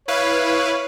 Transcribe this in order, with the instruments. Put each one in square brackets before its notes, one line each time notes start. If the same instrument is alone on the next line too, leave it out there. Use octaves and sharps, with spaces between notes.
[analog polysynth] E4 B4 F5 [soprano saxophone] C#5